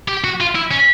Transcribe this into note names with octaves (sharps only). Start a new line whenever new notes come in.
G4
F#4
F4
E4
C#4